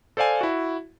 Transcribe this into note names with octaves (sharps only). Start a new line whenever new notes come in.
A4 C5 D5 F5 G#5
E4 F#4